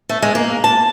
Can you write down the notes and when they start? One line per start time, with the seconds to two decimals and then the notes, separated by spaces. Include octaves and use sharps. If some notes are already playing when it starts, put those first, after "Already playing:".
0.09 A3
0.22 G#3
0.35 A#3
0.64 A5